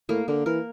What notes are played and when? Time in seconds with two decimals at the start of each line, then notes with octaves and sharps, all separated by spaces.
0.09 A2 A#3
0.28 D3 A#3
0.46 E3 A#4